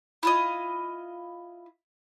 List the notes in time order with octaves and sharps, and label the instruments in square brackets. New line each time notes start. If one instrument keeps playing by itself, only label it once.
[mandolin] E4 F4 D#5